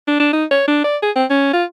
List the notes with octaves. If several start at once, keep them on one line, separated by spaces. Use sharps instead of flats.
D4
D4
D#4
C#5
D4
D5
G#4
C4
C#4
F4